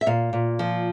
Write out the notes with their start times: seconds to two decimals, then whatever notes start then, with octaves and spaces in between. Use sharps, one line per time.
0.01 E5
0.06 A#2 F5
0.33 A#2
0.59 F3